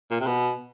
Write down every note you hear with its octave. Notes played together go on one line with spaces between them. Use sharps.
A#2
C3
B2